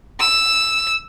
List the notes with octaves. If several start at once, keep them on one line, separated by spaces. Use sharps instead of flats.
E6